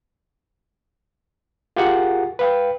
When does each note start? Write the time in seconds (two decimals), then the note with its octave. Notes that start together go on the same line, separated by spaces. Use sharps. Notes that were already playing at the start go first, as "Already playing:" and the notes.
1.76 F4 G4 G#4 A#4 F#5
2.39 B4 F5 G5